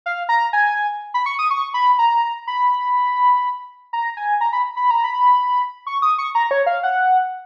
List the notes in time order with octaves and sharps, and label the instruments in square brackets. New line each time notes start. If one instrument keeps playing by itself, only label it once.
[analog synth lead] F5
A#5
G#5
B5
C#6
D#6
C#6
B5
A#5
B5
A#5
G#5
A#5
B5
B5
A#5
B5
C#6
D#6
C#6
A#5
C#5
F5
F#5